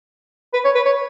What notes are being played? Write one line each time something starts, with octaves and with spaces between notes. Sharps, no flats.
B4
C#5
B4
C#5